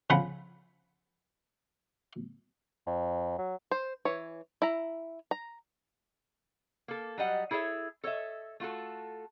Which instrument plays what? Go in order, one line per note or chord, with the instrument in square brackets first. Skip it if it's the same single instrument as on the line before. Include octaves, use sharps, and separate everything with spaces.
[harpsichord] C#3 F3 F#5 B5
[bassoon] F2
F#3
[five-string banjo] C5
E3 C#5
E4 A#5
A#5
[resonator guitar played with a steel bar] A#3 A4
F#3 G3 D#5 F#5
E4 G#4 A4 C#5 E5
A4 C#5 D#5 E5
A3 F4 F#4 A4